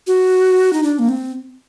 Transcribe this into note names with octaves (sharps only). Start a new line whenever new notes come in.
F#4
D#4
D4
A#3
C4